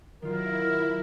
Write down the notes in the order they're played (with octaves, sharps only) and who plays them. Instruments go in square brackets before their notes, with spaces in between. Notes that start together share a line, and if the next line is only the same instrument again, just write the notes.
[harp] D#3 F4 [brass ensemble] F#3 [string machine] E4 [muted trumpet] A#4